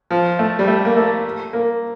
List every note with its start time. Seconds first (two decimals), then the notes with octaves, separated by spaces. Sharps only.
0.10 F3
0.39 A3
0.59 G3
0.67 A3
0.85 A#3
0.96 A3
1.53 A#3